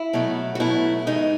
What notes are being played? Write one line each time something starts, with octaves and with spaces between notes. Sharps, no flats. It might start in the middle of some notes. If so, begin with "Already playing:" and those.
Already playing: E4
B2 F#3 A3
F#4
B2 F#3 A3 E4
G#2 E3 A3 D#4